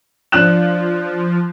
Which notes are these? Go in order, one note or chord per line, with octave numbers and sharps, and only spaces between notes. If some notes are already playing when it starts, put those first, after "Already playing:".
F3 D4 F#6 E7